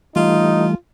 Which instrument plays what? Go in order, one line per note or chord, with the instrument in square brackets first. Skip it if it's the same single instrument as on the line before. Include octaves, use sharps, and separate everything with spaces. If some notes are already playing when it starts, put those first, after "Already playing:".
[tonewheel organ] E3 G3 A3 [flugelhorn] D#4 [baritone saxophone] F4